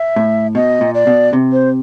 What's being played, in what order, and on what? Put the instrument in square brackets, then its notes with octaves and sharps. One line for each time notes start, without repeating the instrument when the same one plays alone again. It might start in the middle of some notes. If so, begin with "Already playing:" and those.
Already playing: [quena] E5
[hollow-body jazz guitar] A2
[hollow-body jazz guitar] B2 [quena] D#5
[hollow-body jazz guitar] A#2
[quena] D5
[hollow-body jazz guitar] B2
C3
[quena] C5